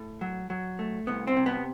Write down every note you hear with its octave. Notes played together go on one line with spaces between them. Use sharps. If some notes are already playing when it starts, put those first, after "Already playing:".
Already playing: A2 A4
F#3
F#3
A3
C2 B3
C4
C3
B3